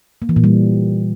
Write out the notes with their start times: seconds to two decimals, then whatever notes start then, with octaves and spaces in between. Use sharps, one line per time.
0.22 A#3
0.29 E3
0.36 A#2
0.44 G3